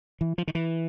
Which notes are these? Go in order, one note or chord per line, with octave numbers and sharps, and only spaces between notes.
E3
F3
D#3
E3